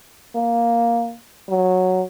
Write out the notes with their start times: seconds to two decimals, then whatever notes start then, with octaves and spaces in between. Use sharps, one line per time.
0.35 A#3
1.49 F#3